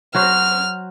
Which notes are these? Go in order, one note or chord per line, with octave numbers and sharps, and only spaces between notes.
F#3 F#4 C5 F6